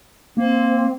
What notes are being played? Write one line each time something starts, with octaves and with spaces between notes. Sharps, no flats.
A#3 C4